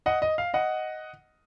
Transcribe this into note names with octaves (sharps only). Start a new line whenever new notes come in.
D#5 F#5
D#5
F5
D#5 F#5